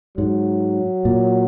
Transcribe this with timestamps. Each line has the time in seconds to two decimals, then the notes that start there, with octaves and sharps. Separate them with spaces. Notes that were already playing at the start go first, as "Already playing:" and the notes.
0.18 G#2 F#3
1.05 A#2